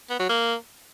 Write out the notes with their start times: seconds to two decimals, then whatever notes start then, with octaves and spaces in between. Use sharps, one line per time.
0.10 B3
0.20 F#3
0.29 A#3